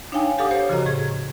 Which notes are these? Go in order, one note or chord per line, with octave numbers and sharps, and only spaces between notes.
D4 D#4 C#5 F5 G5 G#5
G4 A4 F5 F#5 D6 D#6
G4 A4 C5 C#5
C#3 F3 F#4 A4 D#5 A#5
A2 G#4 G#6